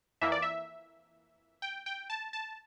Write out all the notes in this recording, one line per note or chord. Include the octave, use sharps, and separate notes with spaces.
F2 E3 A#3 E5
D5
E5
G5
G5
A5
A5